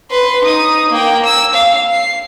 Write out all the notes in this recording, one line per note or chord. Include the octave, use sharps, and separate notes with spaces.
B4 C6
D#4 D#6
A#3 G5
E6
F5
C7